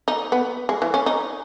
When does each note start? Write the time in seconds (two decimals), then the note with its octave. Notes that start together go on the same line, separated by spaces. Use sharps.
0.08 D#4
0.32 B3
0.69 G#3
0.82 E3
0.94 C#4
1.06 D#4